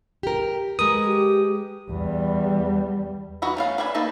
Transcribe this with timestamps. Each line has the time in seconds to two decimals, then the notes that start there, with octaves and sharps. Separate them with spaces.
0.23 G4 A#4
0.79 G#3 A#4 B4 D#6
1.06 G4
1.90 E2 G3
3.42 D#4 E4 F#4 B4
3.57 A3 C#4 F5
3.78 B4 D5 E5 G#5 B5
3.94 A#3 D#4 B4 E5 A5